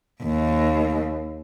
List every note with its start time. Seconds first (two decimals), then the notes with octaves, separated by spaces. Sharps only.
0.23 D#2